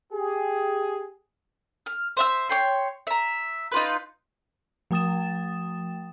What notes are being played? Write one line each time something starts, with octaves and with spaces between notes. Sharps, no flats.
G4 G#4
F6
C5 E5 E6
C#5 G5 C6
E5 A#5
D#4 F4 B4
F3 A3 G5 D#6 A6 E7